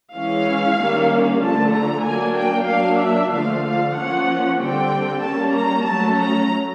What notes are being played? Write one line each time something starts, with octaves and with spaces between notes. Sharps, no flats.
E3 G#3 C#4 F5
D#3 G3 A#3 C#4
D3 F3 A3 A5
A#5
F#3 A#3 D4 G#5
G5
F#3 A#3 D4 F5
E5
D3 F3 A3 F5
F5
F3 A#3 C#4 F#5
D3 G3 C4 G5
G3 A#3 C#4 A5
A#5
F#3 A3 C#4 A5
A#5